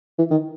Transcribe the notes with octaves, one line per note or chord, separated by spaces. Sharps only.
E3
D#3